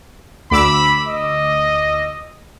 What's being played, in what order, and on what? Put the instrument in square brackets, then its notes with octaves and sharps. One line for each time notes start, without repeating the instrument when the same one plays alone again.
[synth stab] D2 D6 E6 [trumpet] B5
[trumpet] D#5